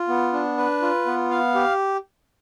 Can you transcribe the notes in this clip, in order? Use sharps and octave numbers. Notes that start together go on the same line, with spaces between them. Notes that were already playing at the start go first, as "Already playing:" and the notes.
Already playing: F4
B3
D4
B4
F4
B3
F5
G4